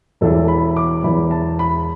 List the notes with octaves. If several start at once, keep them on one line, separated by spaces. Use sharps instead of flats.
E1 E2 E3 A4
B5
D6
E1 E2 E3 B5
A5
B5